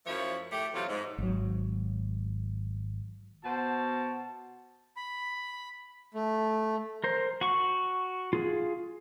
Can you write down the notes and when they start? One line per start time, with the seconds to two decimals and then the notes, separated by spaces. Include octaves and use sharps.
0.06 F#2 F3 A3 E4 C#5
0.52 A2 A3 G4
0.74 C3 E3 F#3 A3 F4
0.88 G#2
1.18 G#1 F#3
3.44 B2 F#4 C5 A5
4.97 B5
6.14 A3
7.04 A#4 C5
7.41 F#4 C#6
8.33 F4 G#4